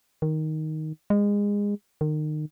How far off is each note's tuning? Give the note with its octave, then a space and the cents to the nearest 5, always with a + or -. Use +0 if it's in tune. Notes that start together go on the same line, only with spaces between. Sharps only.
D#3 +5
G#3 -25
D#3 -30